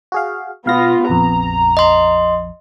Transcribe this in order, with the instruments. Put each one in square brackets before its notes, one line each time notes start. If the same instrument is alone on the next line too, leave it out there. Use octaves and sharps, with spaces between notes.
[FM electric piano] F#4 G#4 F5
[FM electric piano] B2 F5 A#6 [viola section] B3 F4
[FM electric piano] A#1 F2 [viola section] A#5
[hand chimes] D#5 C6